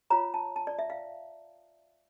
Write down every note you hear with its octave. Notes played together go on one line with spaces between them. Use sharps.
F4 C#5 A#5
A5
A5
D5
E5
F5